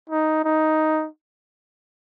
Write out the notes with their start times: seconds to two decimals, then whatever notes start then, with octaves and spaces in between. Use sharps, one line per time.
0.10 D#4
0.45 D#4